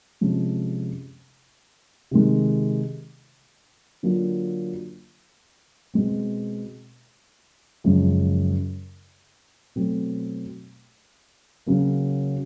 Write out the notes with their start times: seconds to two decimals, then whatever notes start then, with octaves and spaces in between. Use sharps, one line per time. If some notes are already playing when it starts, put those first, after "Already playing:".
0.21 C3 F3 G#3 C#4
2.11 C3 D#3 G#3
4.03 D3 F#3 A#3 D4 F4
5.94 B2 G#3 C4
7.84 F#2 C#3 F3 G#3
9.76 B2 F#3 A3 C4
11.66 C#3 F#3 A#3